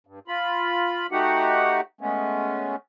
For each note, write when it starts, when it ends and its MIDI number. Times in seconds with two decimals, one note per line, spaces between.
0.07 0.19 43
0.28 1.07 65
0.28 1.07 83
1.12 1.81 57
1.12 1.81 63
1.12 1.81 66
1.12 1.81 67
1.12 1.81 78
2.01 2.76 56
2.01 2.76 57
2.01 2.76 59
2.01 2.76 61